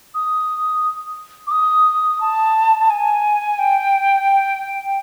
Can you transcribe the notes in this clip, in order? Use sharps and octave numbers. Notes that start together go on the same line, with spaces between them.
D#6
D6
D#6
A5
G#5
G5